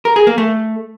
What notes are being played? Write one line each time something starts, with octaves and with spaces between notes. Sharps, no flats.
A#4
G#4
A#3
A3